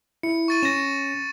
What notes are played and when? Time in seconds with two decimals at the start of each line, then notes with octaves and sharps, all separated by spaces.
0.23 E4 C#7
0.48 C#6 A6 D#7
0.63 C#4 A#6 E7